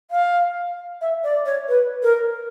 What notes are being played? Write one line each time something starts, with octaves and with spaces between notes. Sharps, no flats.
F5
E5
D5
C#5
B4
A#4